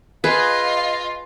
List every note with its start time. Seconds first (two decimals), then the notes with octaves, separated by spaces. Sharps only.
0.24 F4 G#4 B4 D#5 F5